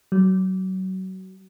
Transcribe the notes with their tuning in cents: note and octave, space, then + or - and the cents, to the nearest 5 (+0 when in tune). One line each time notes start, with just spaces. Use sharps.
F#3 +25